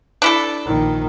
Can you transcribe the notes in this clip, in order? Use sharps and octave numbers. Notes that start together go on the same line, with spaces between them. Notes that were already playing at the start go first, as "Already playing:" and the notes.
D4 E4 A4
A#1 D#3